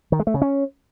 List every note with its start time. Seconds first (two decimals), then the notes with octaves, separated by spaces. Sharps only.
0.12 D#3
0.19 G#3
0.27 A3
0.34 C#3
0.42 C#4